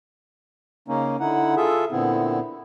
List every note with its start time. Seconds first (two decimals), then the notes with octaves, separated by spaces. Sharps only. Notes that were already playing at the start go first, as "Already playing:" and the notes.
0.88 C#3 A#3 C#4 D#4
1.20 D3 D#4 E4 F#5
1.57 F4 G#4 A4 E5
1.92 A#2 D3 B3 C4 E4